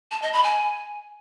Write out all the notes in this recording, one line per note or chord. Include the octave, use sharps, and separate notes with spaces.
A5
D#5
B5
G#5